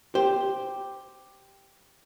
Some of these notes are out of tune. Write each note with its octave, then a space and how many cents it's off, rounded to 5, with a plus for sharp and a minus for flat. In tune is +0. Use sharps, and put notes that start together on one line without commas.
G4 +0 C5 +0